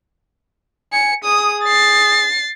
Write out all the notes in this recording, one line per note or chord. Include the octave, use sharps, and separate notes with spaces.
G#5 C#7
G#4 D#6
A6 C7